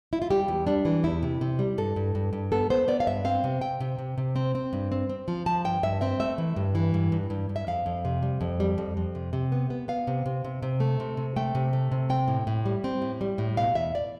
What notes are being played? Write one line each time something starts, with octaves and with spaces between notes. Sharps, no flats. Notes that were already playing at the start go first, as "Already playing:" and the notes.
E4
F4
G3 G4
E2
G3 D4
E3
E2 E4
C3
C3
G3
G2 A4
G2
G2
G2
B3 A4
B3 C5
B3 D5
F5
G2 E5
C4 F5
C3
C3 G5
C3
C3
C3
C4
C4
G2
C4
C4
F3
F3 A5
G2 G5
G2 E5
C4 E5
A3 E5
E3
G2
E3
G2
G2
G2
G2
E5
F2 F5
F2
C3
G3
F2
G3
F2
F2
C3
C3
B3
B3
B3 F5
C3
C3
C3
C3
A3
C3
C3
A3 G5
C3
A3
C3
C4 G5
A2
A2
G3
C4
A2
G3
A2
B2 F5
E2 E5
D5